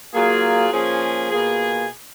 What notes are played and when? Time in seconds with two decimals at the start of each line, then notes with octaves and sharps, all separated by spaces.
0.13 F#3 A#3 F4 G#4
0.71 F3 A#3 C#4 G#4
1.31 B2 A#3 F4 G#4